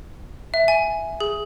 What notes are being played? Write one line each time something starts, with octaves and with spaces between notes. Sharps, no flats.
E5
G#5
G#4